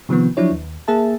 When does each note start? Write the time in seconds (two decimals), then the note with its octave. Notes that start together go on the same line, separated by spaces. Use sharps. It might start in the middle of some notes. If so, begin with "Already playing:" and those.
0.09 C3 D#3 F3 B3
0.37 F3 F#3 D4 E4 C#5
0.51 D#2
0.88 A#3 G#4 E5 A5